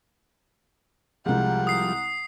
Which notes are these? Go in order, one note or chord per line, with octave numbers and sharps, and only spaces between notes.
C2 F3 G3 G#3 F#5
D#6 C7